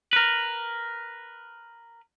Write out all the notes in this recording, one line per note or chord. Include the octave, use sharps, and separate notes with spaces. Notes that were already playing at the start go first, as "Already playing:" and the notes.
A#4 B4